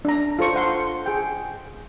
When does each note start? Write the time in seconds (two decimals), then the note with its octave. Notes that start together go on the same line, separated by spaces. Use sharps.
0.05 D4 A#5
0.39 F4 A4 C5 C#6
0.55 C5 F#5 C6
1.06 G#4 G5